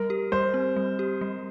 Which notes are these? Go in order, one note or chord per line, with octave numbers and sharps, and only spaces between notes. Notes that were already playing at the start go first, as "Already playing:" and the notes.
Already playing: G3 A#4
G4
G3 C5
C4
G3
G4
G3